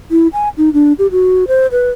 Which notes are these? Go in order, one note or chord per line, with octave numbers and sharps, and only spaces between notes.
E4
G#5
D#4
D4
G4
F#4
C5
B4